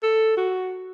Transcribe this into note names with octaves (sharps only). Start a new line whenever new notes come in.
A4
F#4